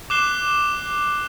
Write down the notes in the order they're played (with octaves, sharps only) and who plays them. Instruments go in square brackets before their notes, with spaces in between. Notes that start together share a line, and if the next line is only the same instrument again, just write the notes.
[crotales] D6 F#6 C7 E7 G7